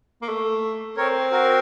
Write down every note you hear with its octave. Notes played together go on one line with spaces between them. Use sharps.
A#3
A3
C4 A#4 C#5
F#4 A#4